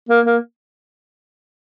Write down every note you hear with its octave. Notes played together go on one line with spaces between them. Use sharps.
A#3
A#3